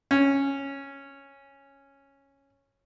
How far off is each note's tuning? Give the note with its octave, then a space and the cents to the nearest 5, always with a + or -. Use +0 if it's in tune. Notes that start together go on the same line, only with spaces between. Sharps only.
C#4 -5